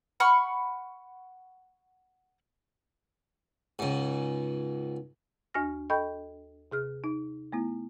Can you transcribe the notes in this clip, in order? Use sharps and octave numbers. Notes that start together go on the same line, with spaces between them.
F#5 B5 C#6 F6
C#2 G#2
D#2 D4 F#4 G#5 F6 A#6
A4 D#5 G5 B5 C#6 G6
C3 G#4 F6
D#4
A3 B3 E4